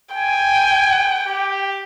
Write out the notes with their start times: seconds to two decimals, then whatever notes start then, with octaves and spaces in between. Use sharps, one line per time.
0.15 G5 G#5
1.27 G4